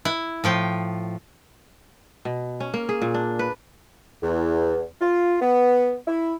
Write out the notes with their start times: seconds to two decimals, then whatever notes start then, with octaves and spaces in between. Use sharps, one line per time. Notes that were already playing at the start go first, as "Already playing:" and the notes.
0.05 E4
0.44 A2 F3 G5
2.25 B2
2.60 C#4
2.74 A#3
2.89 G#4
3.02 A#2
3.14 D4
3.39 B4
4.22 E2
5.01 F4
5.41 B3
6.08 E4